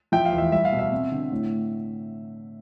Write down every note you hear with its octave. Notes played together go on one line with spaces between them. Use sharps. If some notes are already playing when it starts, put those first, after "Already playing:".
F3 E5 G5
F5
E2
E5
G3 E5
F5
B2
E5
C4
D3
A2